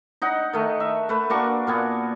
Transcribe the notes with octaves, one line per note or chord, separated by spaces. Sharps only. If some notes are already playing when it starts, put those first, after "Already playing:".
D#4 D#5 F#5
D#3 A3
E5
A3 B4
A#3 D4 F#4 C#6
A#2 B3 G#5